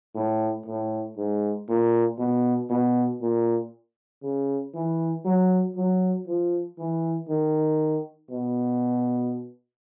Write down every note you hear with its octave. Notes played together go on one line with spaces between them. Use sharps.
A2
A2
G#2
A#2
B2
B2
A#2
C#3
E3
F#3
F#3
F3
E3
D#3
B2